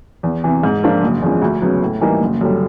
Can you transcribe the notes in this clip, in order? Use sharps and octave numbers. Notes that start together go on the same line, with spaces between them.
E2
C3 E3
G#2
F3 A#3 D4 F4
F#1
E2 C#3 F3 G#3
D2
C#3 F#3 B3
A2
E3 G3 A#3 D#4
F#1
F#2 D3 G3